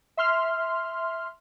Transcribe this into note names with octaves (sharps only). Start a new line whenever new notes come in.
E5 C6 F6